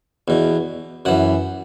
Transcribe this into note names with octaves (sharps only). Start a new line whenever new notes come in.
E2 B2
F#2 E3 F#5